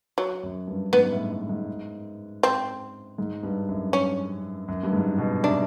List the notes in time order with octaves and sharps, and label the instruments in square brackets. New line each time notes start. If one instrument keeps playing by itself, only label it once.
[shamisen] F#3
[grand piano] F#2
G2
[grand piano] G#2 [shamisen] B3
[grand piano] A2
A2
G#2
[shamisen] C4
[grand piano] G#2
G2
F#2
[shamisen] C#4
[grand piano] F#2
G2
G#2
B2
[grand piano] C3 [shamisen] D4